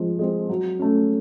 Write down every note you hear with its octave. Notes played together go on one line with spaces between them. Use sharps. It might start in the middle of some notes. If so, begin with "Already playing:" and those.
Already playing: F3 G#3 C4
G#3 C4
F#3
A3 C#4